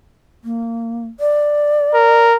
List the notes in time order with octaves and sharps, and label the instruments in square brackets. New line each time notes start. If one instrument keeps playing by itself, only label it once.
[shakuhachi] A#3
D5
[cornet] A#4